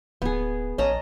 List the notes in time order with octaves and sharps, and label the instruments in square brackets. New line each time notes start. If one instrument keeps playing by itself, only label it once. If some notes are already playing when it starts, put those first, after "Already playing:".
[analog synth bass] D1 [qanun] B3 G#4
[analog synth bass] A#1 [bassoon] C#4 [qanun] D#5 A5 A#5